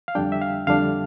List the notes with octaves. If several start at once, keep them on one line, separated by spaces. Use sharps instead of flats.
F5
F2 D3 G3 D4 G5
E5
F5
F2 D3 G3 D4 F5